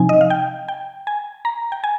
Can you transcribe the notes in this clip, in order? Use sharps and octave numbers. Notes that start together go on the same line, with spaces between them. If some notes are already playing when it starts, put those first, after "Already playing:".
Already playing: C3 F3 C4 D#4 G#5
D#5
F5
G5
G5
G#5
A#5
G5
G#5